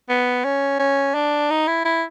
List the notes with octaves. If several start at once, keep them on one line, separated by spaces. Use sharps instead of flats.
B3
C#4
C#4
D4
D#4
E4
E4